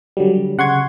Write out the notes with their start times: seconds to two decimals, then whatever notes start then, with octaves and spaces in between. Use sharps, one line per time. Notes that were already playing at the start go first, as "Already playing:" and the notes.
0.17 D3 F#3 G3
0.58 C#3 F#5 C6 C#6 G#6